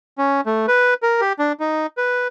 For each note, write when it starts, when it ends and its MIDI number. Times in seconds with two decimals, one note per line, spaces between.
0.18 0.41 61
0.46 0.66 57
0.68 0.94 71
1.03 1.21 70
1.21 1.33 67
1.39 1.52 62
1.60 1.86 63
1.97 2.28 71